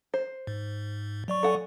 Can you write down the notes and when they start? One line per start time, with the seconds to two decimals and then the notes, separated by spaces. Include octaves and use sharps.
0.14 C5
0.47 G#2
1.28 F#3 D5 C#6
1.43 A4 F#5 G#5